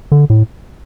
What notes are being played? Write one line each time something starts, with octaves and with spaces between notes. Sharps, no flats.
D3
A2